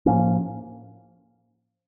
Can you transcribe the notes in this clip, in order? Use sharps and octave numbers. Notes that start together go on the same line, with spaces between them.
A2 F3 A#3 C#4